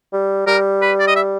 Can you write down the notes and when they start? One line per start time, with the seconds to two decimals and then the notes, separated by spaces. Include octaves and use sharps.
0.13 G3
0.47 G3 A#4
0.82 B4
1.00 D5
1.07 D#5
1.16 E5